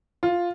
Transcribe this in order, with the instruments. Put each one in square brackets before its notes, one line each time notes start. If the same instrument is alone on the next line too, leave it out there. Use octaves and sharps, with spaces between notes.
[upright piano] F4